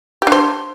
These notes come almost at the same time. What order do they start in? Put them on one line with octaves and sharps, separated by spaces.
G4 D4 C5